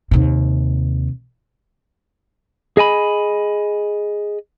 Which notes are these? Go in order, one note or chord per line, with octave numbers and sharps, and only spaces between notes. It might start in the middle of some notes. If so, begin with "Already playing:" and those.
D#2 C3
G#4 D#5 G#5 B5